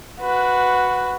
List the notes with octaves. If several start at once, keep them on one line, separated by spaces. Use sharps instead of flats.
F#4 B4